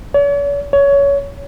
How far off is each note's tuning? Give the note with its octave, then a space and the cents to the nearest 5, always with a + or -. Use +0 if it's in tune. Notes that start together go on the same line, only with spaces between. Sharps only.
C#5 +45
C#5 +20